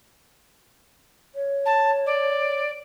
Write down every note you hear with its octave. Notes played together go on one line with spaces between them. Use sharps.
C#5
A5
D5